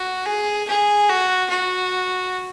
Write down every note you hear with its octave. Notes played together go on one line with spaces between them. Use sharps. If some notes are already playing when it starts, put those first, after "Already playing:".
Already playing: F#4
G#4
G#4
F#4
F#4